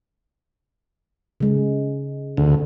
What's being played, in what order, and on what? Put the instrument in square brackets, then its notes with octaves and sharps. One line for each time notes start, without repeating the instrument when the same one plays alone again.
[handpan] C#3 G#3
[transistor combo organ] D2